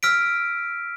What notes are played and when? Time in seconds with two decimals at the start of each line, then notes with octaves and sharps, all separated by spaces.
0.03 E6 F6 B6 D7